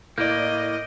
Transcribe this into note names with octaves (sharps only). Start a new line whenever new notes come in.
A2 A#3 D5 D#5 G6 D7